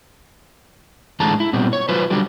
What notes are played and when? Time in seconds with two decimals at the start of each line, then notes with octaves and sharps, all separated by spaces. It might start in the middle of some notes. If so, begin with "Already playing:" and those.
1.20 A2 D3 E3 G#3 A5 A#5
1.40 E4
1.53 A#2 G3 B3 C4
1.73 C#5
1.88 F#3 F4 B4 C5
2.10 D3 F#3 G3 G4